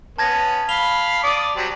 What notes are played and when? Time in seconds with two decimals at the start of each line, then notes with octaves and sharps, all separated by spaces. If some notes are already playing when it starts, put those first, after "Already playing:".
0.18 B3 C#4 A5 G#6 A#6
0.69 F5 B5 F7 G7
1.24 D5 D6 D#6
1.57 F#3 G3 C4